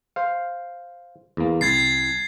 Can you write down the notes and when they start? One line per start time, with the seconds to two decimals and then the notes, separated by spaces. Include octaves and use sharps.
0.16 C5 F5
1.37 E2 A#3
1.61 C2 G#6 A6 C7